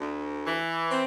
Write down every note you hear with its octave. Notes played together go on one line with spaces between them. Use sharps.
D2
E3
C4